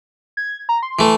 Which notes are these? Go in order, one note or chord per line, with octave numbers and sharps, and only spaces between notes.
G#6
A#5
C6
E3 A3